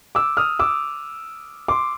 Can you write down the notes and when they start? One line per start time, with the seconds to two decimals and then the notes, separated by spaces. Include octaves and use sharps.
0.15 D6 E6
0.37 D#6 F6
0.59 D6 E6
1.68 C6 D6